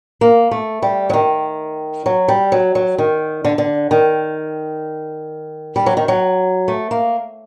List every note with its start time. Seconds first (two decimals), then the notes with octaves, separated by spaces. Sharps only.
0.21 A#3
0.51 A3
0.82 G3
1.10 F#3
1.13 D#3
2.06 F#3
2.28 G3
2.52 F#3
2.75 F#3
2.98 D#3
3.44 D3
3.58 D3
3.91 D#3
5.76 G3
5.86 F#3
5.97 D#3
6.08 F#3
6.68 A3
6.91 A#3